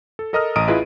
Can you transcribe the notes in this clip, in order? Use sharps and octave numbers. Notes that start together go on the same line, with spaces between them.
A4
A4 A#4 D#5 A#5 D#6 F6
A1 D#5 A#5 D#6 D7 D#7
E4 F4 G#4 B4 D#5